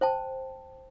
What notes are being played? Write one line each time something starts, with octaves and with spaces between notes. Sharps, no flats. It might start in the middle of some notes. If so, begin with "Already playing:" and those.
C5 G5 A5